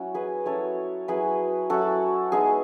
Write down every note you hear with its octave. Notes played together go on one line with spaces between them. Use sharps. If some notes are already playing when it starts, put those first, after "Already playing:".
Already playing: F#3 C#4 E4 F#4
G#4 B4
F#3 C#4 E4 A4 C#5
F#3 C#4 E4 G#4 B4
F#3 C#4 E4 F#4 A4
G#3 B3 D#4 G#4